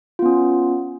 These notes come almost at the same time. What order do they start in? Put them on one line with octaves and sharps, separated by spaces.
F4 B3 C#4